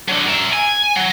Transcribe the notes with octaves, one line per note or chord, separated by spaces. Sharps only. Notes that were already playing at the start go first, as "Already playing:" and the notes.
D3 F#3
A#4 E5
G#5
F#3